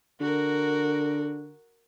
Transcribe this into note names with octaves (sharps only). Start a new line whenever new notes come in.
D3 F#4 A#4